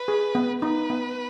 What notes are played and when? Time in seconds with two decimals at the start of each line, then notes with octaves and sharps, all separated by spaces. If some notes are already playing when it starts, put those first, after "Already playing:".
Already playing: B4
0.08 G#4
0.35 B3
0.62 D#4 B4
0.90 B3